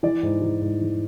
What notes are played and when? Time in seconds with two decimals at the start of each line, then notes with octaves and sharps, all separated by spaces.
0.03 E3 D5
0.23 G#2
0.42 E3
0.62 G#2
0.81 E3